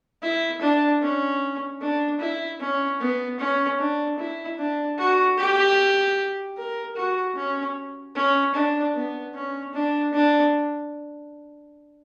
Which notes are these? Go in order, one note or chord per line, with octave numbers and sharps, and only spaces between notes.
E4
D4
C#4
D4
E4
C#4
B3
C#4
D4
E4
D4
F#4
G4
A#4
F#4
C#4
C#4
D4
B3
C#4
D4
D4